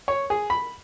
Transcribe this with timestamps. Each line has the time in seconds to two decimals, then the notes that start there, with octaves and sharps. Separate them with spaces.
0.08 C#5
0.30 G#4
0.50 B5